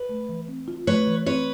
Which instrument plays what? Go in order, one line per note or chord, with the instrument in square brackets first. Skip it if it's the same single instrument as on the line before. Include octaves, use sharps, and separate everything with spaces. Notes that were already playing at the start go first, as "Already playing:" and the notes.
Already playing: [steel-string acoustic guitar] B4
[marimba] A3
E3
C4
F4
[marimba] A3 [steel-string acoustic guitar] B4 C#5
[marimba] E3
[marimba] C4 [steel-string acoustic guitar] B4 C#5